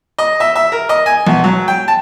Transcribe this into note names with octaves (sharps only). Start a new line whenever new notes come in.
D#5
E5
E5
A#4
D#5
G#5
B1
F#3
G5
A5